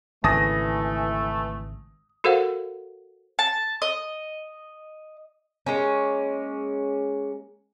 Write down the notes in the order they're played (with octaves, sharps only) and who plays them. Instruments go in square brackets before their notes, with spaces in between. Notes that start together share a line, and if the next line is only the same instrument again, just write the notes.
[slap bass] G#1 C#3 [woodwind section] E3 A3 [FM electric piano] G#5 A5 [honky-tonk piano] D#6 A#6
[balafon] F#4 A4 A#4 C5 F5 F#5
[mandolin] A5
D#5
[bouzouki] G#3 A#3 C#4